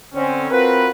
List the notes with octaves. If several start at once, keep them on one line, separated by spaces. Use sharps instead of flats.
D3 C4 C#4
C4 F4 F#4 A#4 B4